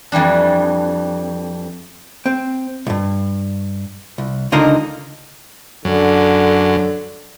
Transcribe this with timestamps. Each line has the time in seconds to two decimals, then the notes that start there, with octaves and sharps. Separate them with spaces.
0.12 F2 E3 G3 D4
2.26 C4
2.87 B1 G2
4.18 C2
4.52 C#2 D3 D#4 A#4 C6
5.85 F#2 D3